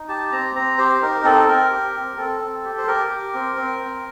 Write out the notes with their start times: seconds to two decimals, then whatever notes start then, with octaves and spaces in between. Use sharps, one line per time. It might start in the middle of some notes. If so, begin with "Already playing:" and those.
Already playing: D#4
0.09 G4 A5
0.32 C4 A#5
0.55 C4 A#5
0.78 G4 C5
1.02 D#4 A#4
1.24 C4 A4
1.48 C4 A#4
1.71 G4
1.95 C4
2.17 C4 A4
2.40 C4
2.64 G4
2.78 C5
2.87 G4 A#4
3.10 G4
3.34 C4
3.56 C4
3.79 C4